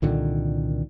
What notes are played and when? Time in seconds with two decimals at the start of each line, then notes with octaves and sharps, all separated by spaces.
0.02 C2 A#2 D3 D#3